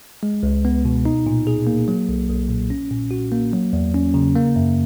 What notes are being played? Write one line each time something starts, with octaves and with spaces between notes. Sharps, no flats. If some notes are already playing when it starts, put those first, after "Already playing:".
G#3
C#2
B3
B2
D#4
A#2
G#4
A#3
F#3
B1
B1
A#2
C#4
A#2
F#4
A#3
F#3
E2
C#4
C#3
A#3
F#2